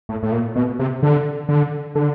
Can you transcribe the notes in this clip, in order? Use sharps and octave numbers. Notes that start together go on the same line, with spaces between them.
A2
A2
A#2
B2
C3
D3
D3
D3